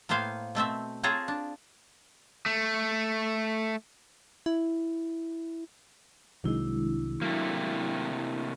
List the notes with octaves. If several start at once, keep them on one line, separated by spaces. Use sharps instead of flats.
A2 A#3 B3 C5 F5 G#5
B2 A3 C4 E5
C4 F4 G#4 C#5 A5 A#5
D4
A3
E4
C2 C3 D#3 F#3 G#3 D4 E4
C3 F#3 A3 A#3